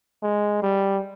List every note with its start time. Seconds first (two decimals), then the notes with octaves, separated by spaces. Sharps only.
0.23 G#3
0.62 G3